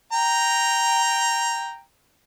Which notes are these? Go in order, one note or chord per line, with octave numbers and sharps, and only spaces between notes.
G5 A#5